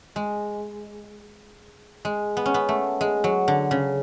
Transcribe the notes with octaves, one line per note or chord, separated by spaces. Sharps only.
G#3
G#3
B3
C#4
B3
A3
G#3
F#3
D3
C#3